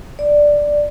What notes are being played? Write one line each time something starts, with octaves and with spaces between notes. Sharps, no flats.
D5